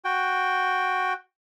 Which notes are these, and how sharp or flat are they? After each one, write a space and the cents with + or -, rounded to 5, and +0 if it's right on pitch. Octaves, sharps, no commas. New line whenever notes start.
F#4 +0 G5 +0